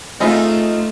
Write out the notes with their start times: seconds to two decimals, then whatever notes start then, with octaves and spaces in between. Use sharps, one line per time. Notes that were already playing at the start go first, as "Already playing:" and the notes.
0.20 A3 C4 D#4 F4 G#4 E5